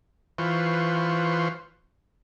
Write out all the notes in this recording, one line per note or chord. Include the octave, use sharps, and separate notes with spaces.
E3 F4 B4 C5 C#6